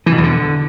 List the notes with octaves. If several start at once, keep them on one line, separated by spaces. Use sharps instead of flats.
E3
B2
E2
D3